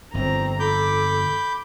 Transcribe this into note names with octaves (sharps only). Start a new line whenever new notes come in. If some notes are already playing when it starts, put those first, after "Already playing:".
G1 F2 C4 A#5
A4 B5 D6 G6